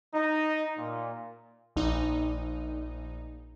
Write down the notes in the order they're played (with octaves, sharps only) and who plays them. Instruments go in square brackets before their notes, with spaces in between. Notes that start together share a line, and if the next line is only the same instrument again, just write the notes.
[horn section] D#4
A#2
[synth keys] A#1 D#4